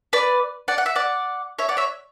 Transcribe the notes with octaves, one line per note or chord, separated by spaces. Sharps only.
B4 D5
D5 F#5
F#5
E5
D5 F#5
C#5 E5
D5 F#5
C#5 E5